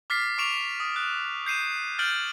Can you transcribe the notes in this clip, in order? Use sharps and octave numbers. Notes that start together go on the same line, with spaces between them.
D6 F6 A6 B6 C7
C#6 D6 D7 E7 F7
D#6
F#6
G6 C7 D#7 E7
F6 G6 A6 D7 F#7